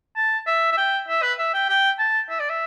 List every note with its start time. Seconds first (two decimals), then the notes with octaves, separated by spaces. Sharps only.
0.17 A5
0.47 E5
0.72 E5
0.78 G5
1.08 E5
1.22 B4
1.39 E5
1.54 G5
1.69 G5
1.99 A5
2.30 E5
2.40 D5
2.50 E5